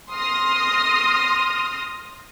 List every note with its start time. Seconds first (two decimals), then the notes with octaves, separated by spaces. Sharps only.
0.13 C6 D#6 F6 A#6